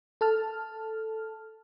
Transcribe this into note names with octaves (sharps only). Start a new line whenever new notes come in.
A4 A5 F6